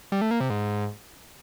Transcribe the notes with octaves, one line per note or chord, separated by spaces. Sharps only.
G3
A3
A#3
C3
G#2